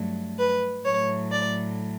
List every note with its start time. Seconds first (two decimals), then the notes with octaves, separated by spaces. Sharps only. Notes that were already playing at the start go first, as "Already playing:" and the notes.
Already playing: G2 F#3 A3
0.38 B4
0.85 A2 F#3 A3 C#5
1.31 D5